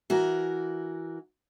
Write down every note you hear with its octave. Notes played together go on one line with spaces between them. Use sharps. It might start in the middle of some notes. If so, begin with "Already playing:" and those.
E3 F#4 A#4